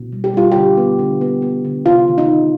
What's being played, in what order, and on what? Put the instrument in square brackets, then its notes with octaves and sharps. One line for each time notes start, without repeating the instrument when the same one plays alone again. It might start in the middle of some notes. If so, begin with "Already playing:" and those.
Already playing: [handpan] B2
G3
G4
G3 F4
D3 G4
B3
D3
B3
B3
D3
C3 F4
D#3
D#4
D#3